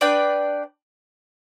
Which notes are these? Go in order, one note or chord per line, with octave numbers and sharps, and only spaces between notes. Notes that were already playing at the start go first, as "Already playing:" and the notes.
D4 B4 D5 G5